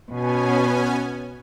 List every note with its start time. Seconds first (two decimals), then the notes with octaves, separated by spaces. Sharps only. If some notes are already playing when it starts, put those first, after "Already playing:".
0.11 B2 B3 C#4 G#5